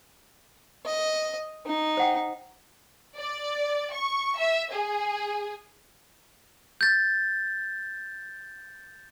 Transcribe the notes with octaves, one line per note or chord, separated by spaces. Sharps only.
D#5
D#4
C5 F#5 G5
D5
C#6
E5
G#4
G6 A6